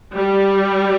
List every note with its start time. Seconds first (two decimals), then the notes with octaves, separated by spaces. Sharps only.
0.15 G3